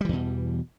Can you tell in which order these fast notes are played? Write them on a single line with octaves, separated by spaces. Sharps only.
G3 E3 E2 B2